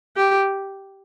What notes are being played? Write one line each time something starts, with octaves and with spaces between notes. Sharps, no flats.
G4